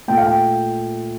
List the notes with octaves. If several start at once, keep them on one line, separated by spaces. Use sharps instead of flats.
A#2 A3 G5
F5
G5